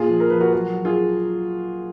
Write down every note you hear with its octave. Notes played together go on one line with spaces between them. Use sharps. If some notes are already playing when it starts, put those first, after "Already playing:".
Already playing: A#2 F4 G#4
F3
A#4
F3 B4
F#4 A#4
F#3 F#4 A#4
F#3
F4 G#4